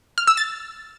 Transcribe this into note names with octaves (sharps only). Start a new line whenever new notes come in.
F6
E6
A6